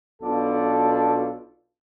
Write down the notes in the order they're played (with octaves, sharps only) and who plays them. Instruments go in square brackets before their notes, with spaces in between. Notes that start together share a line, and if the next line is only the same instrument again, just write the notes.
[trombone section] B1 B2 D4 F4 A4